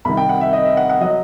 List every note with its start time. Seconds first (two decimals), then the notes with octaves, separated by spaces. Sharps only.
0.05 C2 C3 D#3 B5
0.17 G5
0.29 F#5
0.41 E5
0.53 D#5
0.65 E5
0.77 F#5
0.89 F#5
1.01 F#3 D#5